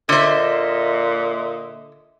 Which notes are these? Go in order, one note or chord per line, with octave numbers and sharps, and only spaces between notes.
A#2 D3 C5 D#5 E5